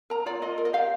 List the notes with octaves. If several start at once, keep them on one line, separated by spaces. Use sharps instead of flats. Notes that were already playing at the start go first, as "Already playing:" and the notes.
A#4 A#5
F4 D5
F4 D#5
A#4
D#5
G4 F5